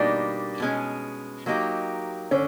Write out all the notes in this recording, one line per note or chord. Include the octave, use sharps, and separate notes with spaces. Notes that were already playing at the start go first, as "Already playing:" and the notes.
Already playing: B2 G3 A#3 D4 D#4
B2 G#3 C#4
F#3 A#3 D#4 G4
D3 C#4